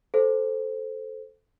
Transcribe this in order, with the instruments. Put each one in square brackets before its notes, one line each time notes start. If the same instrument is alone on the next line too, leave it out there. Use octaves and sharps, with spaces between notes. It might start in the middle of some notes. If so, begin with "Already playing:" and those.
[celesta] A4 C5